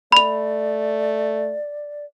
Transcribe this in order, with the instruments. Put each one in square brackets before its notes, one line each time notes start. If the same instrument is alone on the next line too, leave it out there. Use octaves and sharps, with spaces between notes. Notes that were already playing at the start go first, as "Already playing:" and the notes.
[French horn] A3 [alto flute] D5 [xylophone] B5 F7